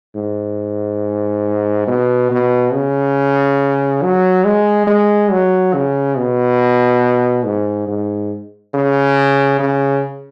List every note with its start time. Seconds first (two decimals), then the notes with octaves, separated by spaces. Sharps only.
0.15 G#2
1.87 B2
2.31 B2
2.73 C#3
4.03 F#3
4.45 G#3
4.87 G#3
5.31 F#3
5.74 C#3
6.17 B2
7.45 G#2
7.88 G#2
8.74 C#3
9.60 C#3